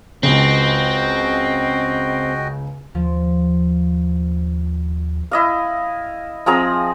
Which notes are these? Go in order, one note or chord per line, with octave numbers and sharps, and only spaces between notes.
C#2 C#3 C4 F#4 D#5 G5
D#2 F3
E4 D#5 F5
F3 C4 G#4 A#5